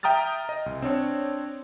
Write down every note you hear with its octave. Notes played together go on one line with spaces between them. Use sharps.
E5 G5 A#5 D#6 F6 A6
D#5
C2
C4 D4 C#5